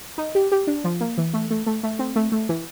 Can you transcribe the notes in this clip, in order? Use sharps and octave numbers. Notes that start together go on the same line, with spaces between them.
D#4
G4
G4
D4
F3
A#3
E3
A3
A3
A3
A3
C4
A3
A3
E3